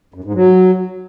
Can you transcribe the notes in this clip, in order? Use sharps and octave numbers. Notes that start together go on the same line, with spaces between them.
F#2
G#2
F#3